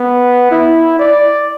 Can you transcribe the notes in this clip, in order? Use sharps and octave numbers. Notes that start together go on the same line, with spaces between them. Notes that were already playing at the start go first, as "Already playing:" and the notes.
Already playing: B3
E4
D5